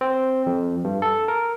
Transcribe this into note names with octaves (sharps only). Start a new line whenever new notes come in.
C4
F2
G2
A4
A#4